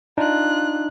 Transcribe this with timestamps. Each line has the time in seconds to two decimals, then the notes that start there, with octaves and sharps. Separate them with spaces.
0.18 D4 D#4 F4 F#6